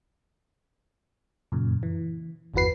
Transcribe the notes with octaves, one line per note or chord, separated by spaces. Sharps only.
F#2 A#2 C#3
E3
G1 E2 E3 F#4 B4 C7